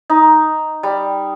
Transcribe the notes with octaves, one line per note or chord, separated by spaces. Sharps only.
D#4
G3